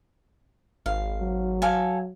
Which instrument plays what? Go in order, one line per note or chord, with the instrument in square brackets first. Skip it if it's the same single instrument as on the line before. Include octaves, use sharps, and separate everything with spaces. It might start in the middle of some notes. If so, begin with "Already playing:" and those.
[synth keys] G#1 [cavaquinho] F5
[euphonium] F#3
[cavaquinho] A4 F5 G#5